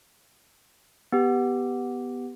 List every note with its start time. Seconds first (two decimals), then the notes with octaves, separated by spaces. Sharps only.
1.12 B3 G4